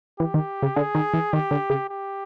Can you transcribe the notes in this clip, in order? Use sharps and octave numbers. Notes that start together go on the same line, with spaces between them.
E3 G4
D#3
C#3
D3 G#4
D#3
E3
D#3 G4
D3
C#3
G4